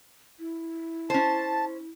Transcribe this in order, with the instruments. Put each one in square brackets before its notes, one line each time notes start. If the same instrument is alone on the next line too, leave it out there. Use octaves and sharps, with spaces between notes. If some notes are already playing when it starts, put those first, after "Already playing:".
[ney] E4
[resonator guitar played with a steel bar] C#4 C5 [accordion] A5